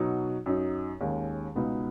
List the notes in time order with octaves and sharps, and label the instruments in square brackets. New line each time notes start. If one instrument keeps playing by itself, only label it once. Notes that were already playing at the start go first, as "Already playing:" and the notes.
Already playing: [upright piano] B2 F#3 D#4 F#4
F#2 F#3 D#4
D#2 D#3 G#3 C#4
C#2 B2 B3 D#4